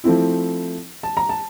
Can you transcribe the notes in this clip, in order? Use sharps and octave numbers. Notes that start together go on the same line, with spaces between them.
F3 A3 C4 E4
A5
A#5
A5